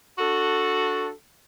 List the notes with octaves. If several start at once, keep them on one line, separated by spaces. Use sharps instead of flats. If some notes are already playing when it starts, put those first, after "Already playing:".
D4 F#4 A4